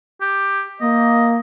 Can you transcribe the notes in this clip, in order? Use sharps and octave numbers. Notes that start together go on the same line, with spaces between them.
G4
A#3 D#5